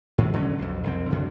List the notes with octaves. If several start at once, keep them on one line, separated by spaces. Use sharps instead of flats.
G#2 E3
D3 F#3 A3 C#4
B1 F2
C2 F2 C4
F#2 D3